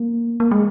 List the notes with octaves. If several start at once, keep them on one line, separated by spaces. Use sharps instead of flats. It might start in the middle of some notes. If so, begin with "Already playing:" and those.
Already playing: A#3
A#3
G#3